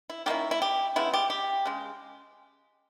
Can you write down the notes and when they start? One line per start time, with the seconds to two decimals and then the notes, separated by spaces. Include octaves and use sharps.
0.10 E4
0.26 D#3 A#3 C#4 E4 G4
0.51 E4
0.62 G4
0.96 C#3 G#3 B3 E4
1.14 G4
1.30 G4
1.65 C#3 G#3